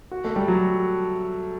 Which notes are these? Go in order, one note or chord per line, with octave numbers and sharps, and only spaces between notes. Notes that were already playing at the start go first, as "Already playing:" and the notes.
F#4
A3
G3
F#3